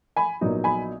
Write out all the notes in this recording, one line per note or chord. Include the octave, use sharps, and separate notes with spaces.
G#5 B5
A#1 A#2 F#3 B3 D#4
G#5 B5